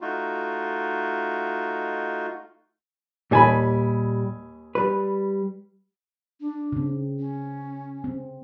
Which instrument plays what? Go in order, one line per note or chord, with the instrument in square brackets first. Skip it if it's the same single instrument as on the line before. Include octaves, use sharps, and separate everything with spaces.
[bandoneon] A3 D#4 F4 F#4
[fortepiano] D#2 G#5 B5 [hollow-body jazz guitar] A#2 G3 A5
[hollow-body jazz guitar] G3 B4
[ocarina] D4
[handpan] C#3 C4
[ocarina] C#4
[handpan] C4